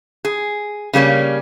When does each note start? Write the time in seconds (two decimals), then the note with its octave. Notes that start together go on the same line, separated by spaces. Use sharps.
0.25 G#4
0.93 C#3 G3 A#3 C#4